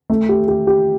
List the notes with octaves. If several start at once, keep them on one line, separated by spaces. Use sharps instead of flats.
A3
G4
G4
G4